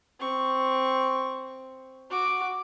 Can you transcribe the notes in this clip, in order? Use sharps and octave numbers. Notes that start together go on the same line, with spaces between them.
C4 C#6
F#4 D6